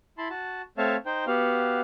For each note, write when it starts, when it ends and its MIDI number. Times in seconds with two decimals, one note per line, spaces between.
0.18 0.28 64
0.18 0.28 81
0.18 0.28 83
0.18 0.28 84
0.30 0.62 66
0.30 0.62 81
0.78 0.96 57
0.78 0.96 60
0.78 0.96 73
0.78 0.96 76
0.78 0.96 77
0.78 0.96 81
1.06 1.25 63
1.06 1.25 72
1.06 1.25 79
1.27 1.81 59
1.27 1.81 66
1.27 1.81 67
1.27 1.81 77